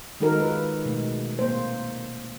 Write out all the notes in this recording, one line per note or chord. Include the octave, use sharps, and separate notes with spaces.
D#3 G#3 D#4 F#4 A4 A#4
F4 B4
B2 G#3 A3
A#2 A#3 C5